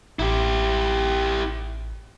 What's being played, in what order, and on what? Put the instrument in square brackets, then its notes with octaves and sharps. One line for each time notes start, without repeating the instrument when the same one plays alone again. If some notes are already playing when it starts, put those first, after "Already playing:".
[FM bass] A1 [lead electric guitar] E4 G4